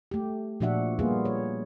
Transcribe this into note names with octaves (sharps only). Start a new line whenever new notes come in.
A3 G4
A#2 F3 D4 F#4 E5 F#5
G3 A#3 B3 F4 G#4
C#5